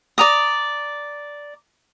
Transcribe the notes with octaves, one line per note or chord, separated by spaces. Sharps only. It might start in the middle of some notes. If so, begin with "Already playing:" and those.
D5 A#5 D#6